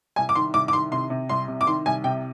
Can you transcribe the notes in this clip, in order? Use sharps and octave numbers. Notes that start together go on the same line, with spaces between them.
C2 G#5
D6
D#3 C6
C2 D6
D6
D#3 C6
C3 C6
C3
C2 C6
C3
D6
D#3 C6
C2 G#5
C3 G5